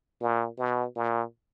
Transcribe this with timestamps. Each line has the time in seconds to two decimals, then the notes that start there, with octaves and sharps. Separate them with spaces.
0.21 A#2
0.58 B2
0.96 A#2